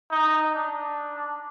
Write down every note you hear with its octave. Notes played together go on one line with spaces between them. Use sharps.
D#4
D4